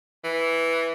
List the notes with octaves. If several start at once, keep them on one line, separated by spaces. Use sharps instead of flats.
E3